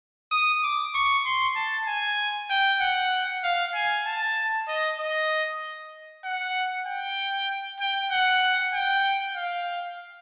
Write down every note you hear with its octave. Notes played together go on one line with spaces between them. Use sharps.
D#6
D6
C#6
C6
A5
G#5
G5
F#5
F5
G#5
A5
D#5
D#5
F#5
G5
G5
F#5
G5
F5